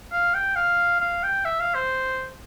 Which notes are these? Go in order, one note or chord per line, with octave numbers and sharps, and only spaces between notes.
F5
G5
F5
F5
G5
E5
F5
C5